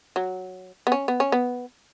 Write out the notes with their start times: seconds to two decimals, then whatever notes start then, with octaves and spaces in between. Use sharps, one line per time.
0.16 F#3
0.87 B3
0.92 C#4
1.08 B3
1.20 C#4
1.32 B3